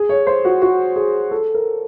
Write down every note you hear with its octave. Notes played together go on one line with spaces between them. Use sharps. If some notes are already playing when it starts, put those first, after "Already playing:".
Already playing: G#4
C#5
C5
F#4
F#4
G#4
A4
A#4